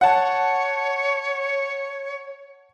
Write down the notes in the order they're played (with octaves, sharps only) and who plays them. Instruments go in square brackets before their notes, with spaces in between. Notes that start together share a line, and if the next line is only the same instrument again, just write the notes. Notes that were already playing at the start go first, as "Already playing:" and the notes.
[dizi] C#5 [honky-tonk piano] F#5 A5